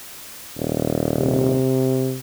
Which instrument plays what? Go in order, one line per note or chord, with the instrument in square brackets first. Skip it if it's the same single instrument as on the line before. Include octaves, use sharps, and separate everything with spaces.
[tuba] D#1
[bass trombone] C3